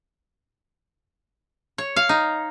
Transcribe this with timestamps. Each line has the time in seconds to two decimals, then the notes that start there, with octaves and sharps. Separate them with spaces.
1.78 C#5
1.96 F5
2.09 D#4